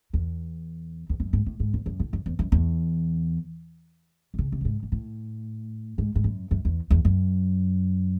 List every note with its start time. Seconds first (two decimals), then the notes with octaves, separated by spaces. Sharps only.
0.13 E2
1.09 E2
1.20 F#2
1.33 G#2
1.46 A2
1.60 G#2
1.74 E2
1.86 F#2
2.00 A2
2.13 F#2
2.26 E2
2.39 F#2
2.52 E2
4.34 C3
4.38 C#3
4.52 C3
4.61 F#2
4.65 G#2
4.83 G#2
4.92 A2
5.98 G#2
6.15 G#2
6.24 F#2
6.51 F#2
6.65 E2
6.90 E2
7.05 F#2